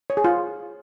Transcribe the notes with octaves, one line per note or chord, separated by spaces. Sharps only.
C#5
G#4
F4